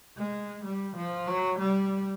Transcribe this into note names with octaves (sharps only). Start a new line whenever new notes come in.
G#3
G3
F3
F#3
G3